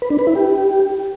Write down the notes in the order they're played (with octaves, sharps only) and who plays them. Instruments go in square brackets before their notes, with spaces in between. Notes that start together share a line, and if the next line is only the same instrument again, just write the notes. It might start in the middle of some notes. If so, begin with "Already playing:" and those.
[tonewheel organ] B4
D4
B4
E4
G4